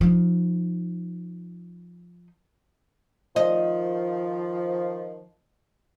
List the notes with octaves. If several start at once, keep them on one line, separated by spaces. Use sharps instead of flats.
F3 D#4
D#3 F3 D#5